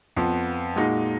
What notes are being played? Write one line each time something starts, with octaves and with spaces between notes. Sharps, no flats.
F2 F3 B3
A#2 G#3 D#4 F#4